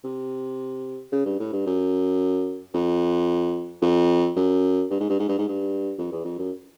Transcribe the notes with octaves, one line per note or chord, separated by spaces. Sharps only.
C3
C#3
G2
A2
G2
F#2
F2
F2
F#2
G2
G#2
G2
G#2
G2
G#2
G2
F2
E2
F2
F#2